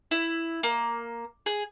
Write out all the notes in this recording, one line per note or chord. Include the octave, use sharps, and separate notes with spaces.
E4
A#3
G#4